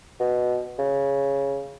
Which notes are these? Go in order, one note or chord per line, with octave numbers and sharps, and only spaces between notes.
B2
C#3